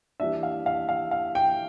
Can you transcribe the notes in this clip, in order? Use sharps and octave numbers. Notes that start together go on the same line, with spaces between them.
E3 G3 A#3 D4 E5
F5
F5
F5
F5
G5